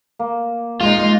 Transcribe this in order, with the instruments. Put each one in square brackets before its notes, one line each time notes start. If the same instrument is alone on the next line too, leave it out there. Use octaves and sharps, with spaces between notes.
[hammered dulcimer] A#3
[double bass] G#3 D#4 [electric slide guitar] F4